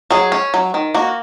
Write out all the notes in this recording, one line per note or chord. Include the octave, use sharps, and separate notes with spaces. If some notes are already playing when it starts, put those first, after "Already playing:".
F#3 G#4
C#4
F#3
D#3
A#3 F#4